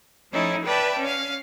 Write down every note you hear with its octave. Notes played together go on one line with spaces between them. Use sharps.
F3 A3 C#4 D#4 E4
B4 D5 E5 G5 A5
C#4 F5